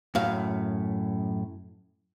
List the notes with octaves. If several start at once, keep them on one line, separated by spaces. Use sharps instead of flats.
F#2 A2 F5